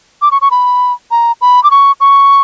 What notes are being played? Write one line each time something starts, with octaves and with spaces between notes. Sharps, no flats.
D6
C#6
C#6
B5
A#5
B5
D6
C#6
C#6